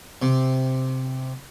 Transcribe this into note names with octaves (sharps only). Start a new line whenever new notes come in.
C3